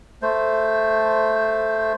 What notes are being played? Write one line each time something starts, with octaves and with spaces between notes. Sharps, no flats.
A3 C5